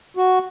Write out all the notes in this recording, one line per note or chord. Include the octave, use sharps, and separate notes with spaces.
F#4